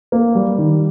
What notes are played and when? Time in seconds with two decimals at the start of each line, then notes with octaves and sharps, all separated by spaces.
0.12 A#3
0.35 G3
0.58 D#3